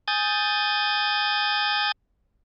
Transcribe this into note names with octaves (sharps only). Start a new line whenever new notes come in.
G#5 D#6 G6 A6